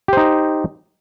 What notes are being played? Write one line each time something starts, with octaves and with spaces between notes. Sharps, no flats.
D#4 G4 C5